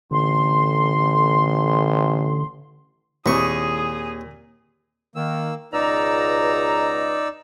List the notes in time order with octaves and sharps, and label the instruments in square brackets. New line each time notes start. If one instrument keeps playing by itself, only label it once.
[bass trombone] A1 [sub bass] D3 [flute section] C6
[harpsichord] D#2 C#6 [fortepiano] A#2 [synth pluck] D#3 C4 E4 [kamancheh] G#4 D#6
[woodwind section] D#3 [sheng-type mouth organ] A#3 E6
[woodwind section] C#2 B2 A#5 [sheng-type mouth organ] D#4 D5 E6